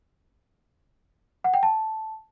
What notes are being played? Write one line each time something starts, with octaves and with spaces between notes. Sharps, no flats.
F#5
G5
A5